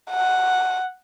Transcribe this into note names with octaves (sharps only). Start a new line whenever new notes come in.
F#5